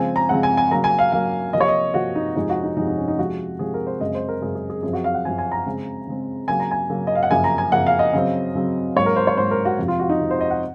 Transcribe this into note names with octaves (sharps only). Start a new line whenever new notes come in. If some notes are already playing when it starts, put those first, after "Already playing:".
Already playing: C#3 F3 G#3 C4 G#5
A#5
C#3 F3 G#3 C4 F#5
G#5
G#5
C#3 F#3 A#3 A#5
G#5
F5
C#3 F#3 A#3 F5
C3 F3 A#3 D#5
C#5
D#5
C3 F3 A#3 F#4
D#4
F2 C3 F3 G#3 D#4
F#4
D#4
F2 C3 F3 G#3 D#4
D#4
C#4
D#4
C3 F3 G#3 F#4
C3 F3 G#3 G#4
A#4
C5
F#2 C#3 G#3 C4 D#5
C5
A#4
F#2 C#3 G#3 C4 G#4
G#4
G#4
F#2 F3 C4 G#4
F#4
F5
F#5
F#2 F3 C4 G#5
G#5
A#5
C#3 G#3 C4
C#3 G#3 C4
C#3 F#3 A#3 G#5
A#5
G#5
C#3 F#3 A#3
D#5
F5
F#5
F#2 C#3 F3 A#3 G#5
A#5
G#5
F#2 C#3 F3 A#3 F#5
F5
D#5
C#3 F#3 C4
C#3 F#3 C4
G#2 F#3 A#3 C#5
A#4
C5
C#5
G#2 F#3 A#3 C5
A#4
F#4
F2 C3 F3
F4
F#4
D#4
F2 C3 F3
C5
D#5
F#5